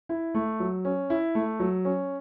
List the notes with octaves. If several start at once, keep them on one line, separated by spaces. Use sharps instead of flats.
E4
A3
F#3
C#4
E4
A3
F#3
C#4